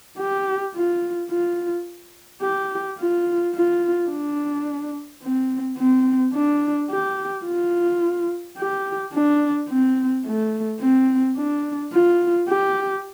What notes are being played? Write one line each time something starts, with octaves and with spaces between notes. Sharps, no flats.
G4
F4
F4
G4
F4
F4
D4
C4
C4
D4
G4
F4
G4
D4
C4
A3
C4
D4
F4
G4